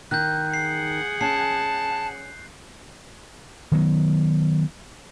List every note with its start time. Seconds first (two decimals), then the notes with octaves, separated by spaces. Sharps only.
0.11 D#3 F#6 G6
0.54 G#4 F#5 C7
1.21 C#4 A5 C7
3.72 D#3 F#3 B3